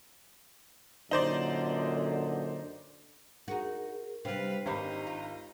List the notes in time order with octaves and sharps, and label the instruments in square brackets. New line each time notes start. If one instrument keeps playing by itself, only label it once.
[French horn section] F#2 A#2 D3 [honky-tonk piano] D#4 C5 D5
[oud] D#4 F#4 [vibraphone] G#4 A#4
[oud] C3 G3 [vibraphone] D4 G5 [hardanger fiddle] B4 F5
[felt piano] G#1 C5 B5 [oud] C#4 G4 [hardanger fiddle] D#4
[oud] F4